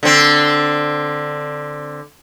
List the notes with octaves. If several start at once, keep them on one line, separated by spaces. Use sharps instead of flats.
D3 C4